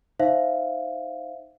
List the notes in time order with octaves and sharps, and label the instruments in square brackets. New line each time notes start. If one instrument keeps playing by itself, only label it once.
[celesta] D#4 C5 E5 F5